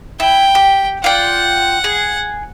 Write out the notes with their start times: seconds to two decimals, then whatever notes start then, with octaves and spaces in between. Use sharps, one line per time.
0.20 E4 G5
0.55 G4
1.04 F4 D5 F#5 G5
1.84 G#4